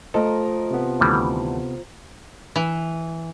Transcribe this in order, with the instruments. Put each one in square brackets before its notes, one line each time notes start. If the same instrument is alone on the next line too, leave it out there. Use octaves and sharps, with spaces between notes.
[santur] F3 A#4 A#5 [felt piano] A3 D#5 [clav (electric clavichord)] A4
[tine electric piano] C3 B3
[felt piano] D2 [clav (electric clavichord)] D#3 E3 G3
[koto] E3